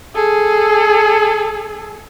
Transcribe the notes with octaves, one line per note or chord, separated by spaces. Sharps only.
G#4 A4